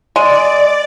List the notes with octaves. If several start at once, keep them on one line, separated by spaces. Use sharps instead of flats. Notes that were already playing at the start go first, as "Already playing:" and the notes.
G#3 D5